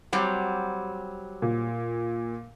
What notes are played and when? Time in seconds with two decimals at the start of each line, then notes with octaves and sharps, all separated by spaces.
0.13 F#3 G3 C4
1.42 A#2